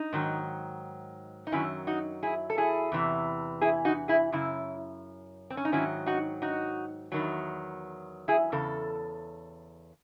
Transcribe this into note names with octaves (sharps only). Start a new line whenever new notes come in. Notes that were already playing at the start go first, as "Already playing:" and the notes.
Already playing: D#4
G#2 D#3 F#3
D#4
F#2 D#3 F#3 C#4 E4
D#4 F#4
E4 G#4
A4
E4 G#4
E2 C3 E3
E4 G#4
D#4 F#4
E4 G#4
F#2 C#3 E4
C4
C#4
D#4
G#2 D#3 F#3 C#4 E4
D#4 F#4
D#4 F#4
E2 D#3 F#3
E4 G#4
E2 C#3 A4